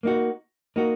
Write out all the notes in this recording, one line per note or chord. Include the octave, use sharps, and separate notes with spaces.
A#3 D#4 F#4
A#3 D#4 F#4